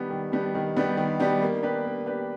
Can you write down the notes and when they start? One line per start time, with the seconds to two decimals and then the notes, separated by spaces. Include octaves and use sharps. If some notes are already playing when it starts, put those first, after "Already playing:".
Already playing: D#3 G3 B3 D4 G4
0.10 D#3
0.32 G3 B3 D4 G4
0.55 D#3
0.77 G3 B3 D4 G4
0.97 D#3
1.20 G3 B3 D4 G4
1.42 A#3
1.63 D4 G4 B4
1.84 A#3
2.06 D4 G4 B4